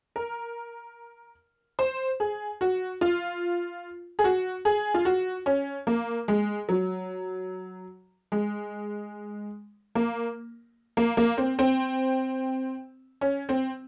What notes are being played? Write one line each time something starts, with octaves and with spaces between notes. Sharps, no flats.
A#4
C5
G#4
F#4
F4
G#4
F#4
G#4
F4
F#4
C#4
A#3
G#3
F#3
G#3
A#3
A#3
A#3
C4
C4
C#4
C4